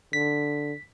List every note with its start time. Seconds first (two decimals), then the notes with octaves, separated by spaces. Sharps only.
0.13 D3 B6